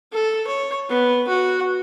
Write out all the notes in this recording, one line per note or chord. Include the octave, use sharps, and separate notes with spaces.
A4
C#5
B3
F#4